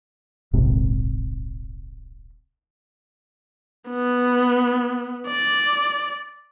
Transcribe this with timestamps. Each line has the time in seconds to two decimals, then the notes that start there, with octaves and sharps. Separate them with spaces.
0.53 D1 A#1 G#2 C3
3.89 B3
5.28 D5